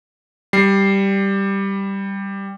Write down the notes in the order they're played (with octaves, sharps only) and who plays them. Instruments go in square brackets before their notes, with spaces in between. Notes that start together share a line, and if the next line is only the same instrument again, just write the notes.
[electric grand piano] G3 C7